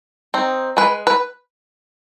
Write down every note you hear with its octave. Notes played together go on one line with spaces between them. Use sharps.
C4 D#4
G#3 B4
B4